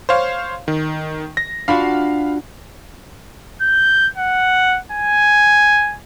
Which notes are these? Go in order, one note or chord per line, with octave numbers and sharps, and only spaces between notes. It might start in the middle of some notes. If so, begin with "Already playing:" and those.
C5 C#5 F5
D#3
A#6
D4 F4 F#4 F5 B5
G6
F#5
G#5